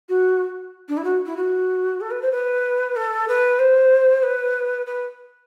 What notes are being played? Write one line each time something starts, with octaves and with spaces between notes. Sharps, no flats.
F#4
D4
E4
F#4
E4
F#4
A4
B4
C5
B4
A4
B4
C5
B4
B4